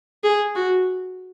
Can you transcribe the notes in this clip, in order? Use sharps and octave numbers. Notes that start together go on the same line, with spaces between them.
G#4
F#4